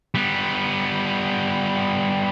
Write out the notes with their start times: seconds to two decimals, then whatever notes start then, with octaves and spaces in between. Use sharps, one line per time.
0.15 G3 B3